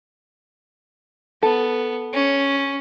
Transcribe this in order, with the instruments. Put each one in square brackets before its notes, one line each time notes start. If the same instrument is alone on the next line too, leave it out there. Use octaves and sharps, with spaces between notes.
[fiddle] B3 [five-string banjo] A4
[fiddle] C#4